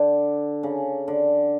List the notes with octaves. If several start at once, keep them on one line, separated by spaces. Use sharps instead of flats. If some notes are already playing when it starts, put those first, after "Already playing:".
Already playing: D3
C#3
D3